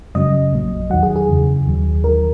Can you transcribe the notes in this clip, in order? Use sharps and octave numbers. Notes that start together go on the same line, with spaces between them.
F#2 C#3 F#3 D#5
A#1 A#2 F#3
E2 D#3 F#3 F#5
G#4
G#4
F#2 C#3 E3
D#2 D#3 F#3
D#2 D#3 F#3 A#4